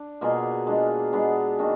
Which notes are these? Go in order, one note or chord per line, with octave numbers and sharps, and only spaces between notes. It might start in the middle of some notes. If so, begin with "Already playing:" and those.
Already playing: D4
B2 A#3 F4 G#4
G#3 D4 F4
G#3 B3 D4 G#4
D#3 A#3 D4 F#4